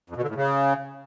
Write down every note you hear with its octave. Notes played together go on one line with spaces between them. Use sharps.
F2
B2
D3
A2
C#3